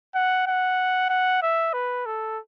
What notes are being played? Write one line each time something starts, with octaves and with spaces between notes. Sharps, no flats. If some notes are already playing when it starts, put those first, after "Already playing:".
F#5
F#5
F#5
E5
B4
A4